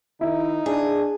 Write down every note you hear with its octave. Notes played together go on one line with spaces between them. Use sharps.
D#3 D#4 E4
D4 G#4